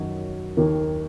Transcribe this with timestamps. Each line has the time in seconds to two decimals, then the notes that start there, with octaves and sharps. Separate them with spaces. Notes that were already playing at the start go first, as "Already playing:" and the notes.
Already playing: F#2 D#3 F#3 D#4 F#4
0.57 D#2 D#3 A#3